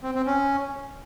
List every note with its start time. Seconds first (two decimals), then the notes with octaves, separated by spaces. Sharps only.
0.03 C4
0.15 C4
0.27 C#4